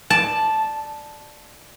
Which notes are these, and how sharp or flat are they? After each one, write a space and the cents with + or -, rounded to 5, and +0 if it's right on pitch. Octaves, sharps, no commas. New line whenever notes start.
D5 +15 A5 -5